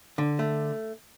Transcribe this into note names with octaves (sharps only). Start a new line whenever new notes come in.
D3
A3